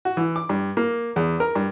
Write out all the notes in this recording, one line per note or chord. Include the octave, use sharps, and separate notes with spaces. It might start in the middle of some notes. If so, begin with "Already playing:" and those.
F#4
E3
D6
G2
A#3
E2
A#4
G2